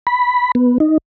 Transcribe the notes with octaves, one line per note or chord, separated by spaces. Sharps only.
B5
B3
D#4